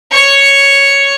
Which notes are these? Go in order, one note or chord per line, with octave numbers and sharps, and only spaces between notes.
C#5 C#6